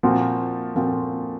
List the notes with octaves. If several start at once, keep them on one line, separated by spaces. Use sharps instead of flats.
A#2 F3 C4 F#4
A#2 F3 C4 F#4